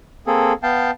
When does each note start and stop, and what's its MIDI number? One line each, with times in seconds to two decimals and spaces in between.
0.27 0.53 58
0.27 0.53 60
0.27 0.53 68
0.27 0.53 69
0.63 0.91 59
0.63 0.91 77
0.63 0.91 79
0.63 0.91 81